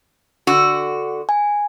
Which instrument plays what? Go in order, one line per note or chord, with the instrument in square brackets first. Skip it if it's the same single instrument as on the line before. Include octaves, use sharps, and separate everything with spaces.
[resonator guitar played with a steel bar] D3 F#4
[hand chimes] G#5